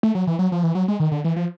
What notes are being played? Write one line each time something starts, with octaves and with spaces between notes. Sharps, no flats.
A3
F#3
E3
F#3
F3
E3
F#3
G#3
D#3
D3
E3
F3